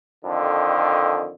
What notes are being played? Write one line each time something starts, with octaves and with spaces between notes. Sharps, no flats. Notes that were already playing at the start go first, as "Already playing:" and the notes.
F2 D3 D#3